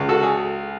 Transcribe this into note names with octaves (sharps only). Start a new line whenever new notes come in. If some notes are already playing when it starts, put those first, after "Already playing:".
Already playing: C#2 C#3
F#4 A4
G#4